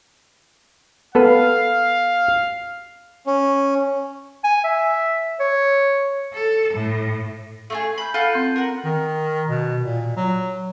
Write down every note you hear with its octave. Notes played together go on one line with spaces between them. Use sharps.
B3 A4 B4 F5
C#4
G#5
E5
C#5
A4
A2
A3 F4 G#4
B5 G6
F4 A4 F#5
C4 G6
A#4 F#5
D#3
B2
A#2
F#3